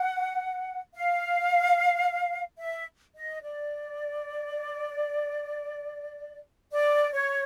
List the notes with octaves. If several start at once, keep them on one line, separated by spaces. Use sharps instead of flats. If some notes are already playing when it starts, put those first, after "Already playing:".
Already playing: F#5
F5
E5
D#5
D5
D5
C#5